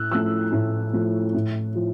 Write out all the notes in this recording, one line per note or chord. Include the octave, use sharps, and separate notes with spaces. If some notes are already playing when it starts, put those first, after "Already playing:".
Already playing: A2 E6 F#6
F3 A3 E6 F#6
A2
F3 A3
A2
F3